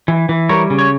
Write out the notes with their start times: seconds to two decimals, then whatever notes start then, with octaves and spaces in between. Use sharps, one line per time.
0.08 E3
0.29 E3
0.49 G3 A#4 C#5
0.70 C#3
0.79 C#5